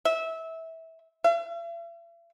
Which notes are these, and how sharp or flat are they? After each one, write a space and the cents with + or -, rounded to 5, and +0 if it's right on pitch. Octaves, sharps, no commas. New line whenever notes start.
E5 -20
E5 +45